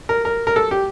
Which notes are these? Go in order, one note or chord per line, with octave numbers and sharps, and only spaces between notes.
A#4
A#4
A#4
A4
G4